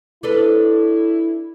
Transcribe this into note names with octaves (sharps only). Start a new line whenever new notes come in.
D4 E4 A4 B4